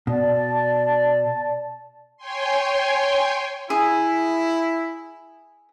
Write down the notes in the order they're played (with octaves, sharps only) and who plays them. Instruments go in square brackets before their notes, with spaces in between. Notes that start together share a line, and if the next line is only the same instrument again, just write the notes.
[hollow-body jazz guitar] B2 [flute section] D5 A5
[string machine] C#5 G5 G#5 C6
[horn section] E4 [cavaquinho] G#4